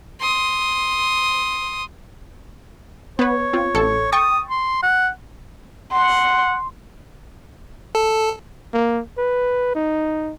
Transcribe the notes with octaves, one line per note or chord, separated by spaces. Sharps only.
C6 D#6
B3 B4 C#5
C4 F4
A1 A4 C#7
G5 C#6 D#6 A6
C6
F#5
F#5 C6
A4
A#3
B4
D#4